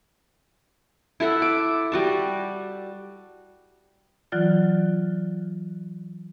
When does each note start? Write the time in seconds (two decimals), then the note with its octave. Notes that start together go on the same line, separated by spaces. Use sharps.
1.20 E4 A4 E5 F#5
1.42 D6
1.92 G3 F#4 A5
4.32 E3 F#3 F4 D5 F#6 A6